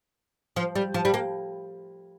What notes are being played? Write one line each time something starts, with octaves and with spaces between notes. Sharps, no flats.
F3
G3
F3
G3
A#3